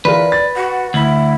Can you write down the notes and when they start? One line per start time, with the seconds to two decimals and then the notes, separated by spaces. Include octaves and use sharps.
0.05 E3 F4 A#4 B4 D5
0.32 A6
0.56 F#4 F#5
0.94 D2 E4 F#7